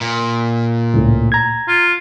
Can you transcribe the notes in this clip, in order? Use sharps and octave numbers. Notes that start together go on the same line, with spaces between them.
A#2
C#2 A2
A#5 G#6
F4